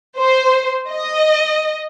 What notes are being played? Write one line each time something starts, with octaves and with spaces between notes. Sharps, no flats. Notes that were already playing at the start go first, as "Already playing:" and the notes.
C5
D#5